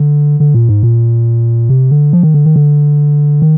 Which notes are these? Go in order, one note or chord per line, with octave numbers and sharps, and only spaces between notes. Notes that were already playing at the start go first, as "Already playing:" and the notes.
Already playing: D3
D3
A#2
G#2
A#2
C3
D3
F3
D#3
D3
D#3
D3
D#3